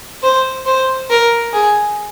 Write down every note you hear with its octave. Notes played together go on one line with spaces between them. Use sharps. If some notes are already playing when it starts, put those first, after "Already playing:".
C5
C5
A#4
G#4